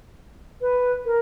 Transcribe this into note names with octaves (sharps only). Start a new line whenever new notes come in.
B4
A#4